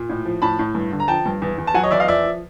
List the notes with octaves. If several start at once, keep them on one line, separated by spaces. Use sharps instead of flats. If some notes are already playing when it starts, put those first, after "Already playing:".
Already playing: A#2
A2
F3
A2 A5 B5
A2
G2
D3
A#5
F3 G5 A5
G2
E2
E2
A5
F#3 F#5 G#5
C#5 D#5
E2 D5 E5
D#5 F5
F3 D5 E5
F3